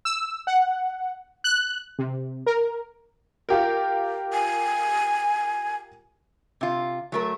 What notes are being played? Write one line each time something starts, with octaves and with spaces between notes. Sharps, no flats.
E6
F#5
F#6
C3
A#4
F4 G4 A#4
G#5
C3 F4
F#3 A3 A#4